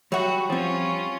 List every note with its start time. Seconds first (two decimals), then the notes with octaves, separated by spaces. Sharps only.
0.12 F#3 G3 F#4 E5 F#5
0.50 F3 C4 C#4 F4